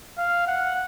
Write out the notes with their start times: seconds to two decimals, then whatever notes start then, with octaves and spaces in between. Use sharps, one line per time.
0.18 F5
0.47 F#5